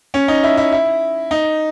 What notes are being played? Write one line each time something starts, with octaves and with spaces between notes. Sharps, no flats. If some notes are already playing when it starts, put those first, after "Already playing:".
C#4
D#4
E4
E4
E4
D#4